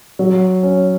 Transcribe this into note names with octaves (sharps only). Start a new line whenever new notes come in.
F#3
C#4